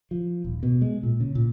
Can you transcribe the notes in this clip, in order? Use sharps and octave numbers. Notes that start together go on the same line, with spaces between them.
F3
D#1
B2
G#3
A#2
C#3
A#2